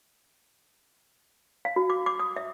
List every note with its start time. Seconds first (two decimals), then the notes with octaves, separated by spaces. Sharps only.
1.65 F5
1.76 F#4
1.90 D6
2.06 D6
2.19 D#6
2.36 E5